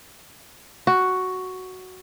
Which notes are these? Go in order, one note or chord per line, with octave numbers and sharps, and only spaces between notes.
F#4